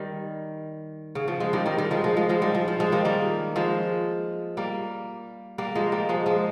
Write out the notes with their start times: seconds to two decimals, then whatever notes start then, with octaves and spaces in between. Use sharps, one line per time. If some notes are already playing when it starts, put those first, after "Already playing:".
Already playing: D#3 G3
1.15 C#3
1.28 F3
1.40 F3 G#3
1.53 D#3 G3
1.66 D#3 G3
1.78 D#3 G3
1.91 F3 G#3
2.04 F3 G#3
2.17 F3 G#3
2.29 F3 G#3
2.42 D#3 G3
2.55 F3
2.68 F3
2.80 F3 G#3
2.92 D#3 G3
3.05 G3 A#3
3.56 F3 G#3
4.57 G3 A#3
5.58 G3 A#3
5.75 F3 G#3
5.92 G3 A#3
6.09 F3 G#3
6.26 F3 G#3